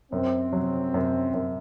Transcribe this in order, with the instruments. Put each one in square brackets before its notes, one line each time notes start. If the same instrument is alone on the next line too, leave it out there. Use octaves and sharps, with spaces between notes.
[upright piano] F#2 [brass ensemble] C4
[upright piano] F#3
F#2
F#2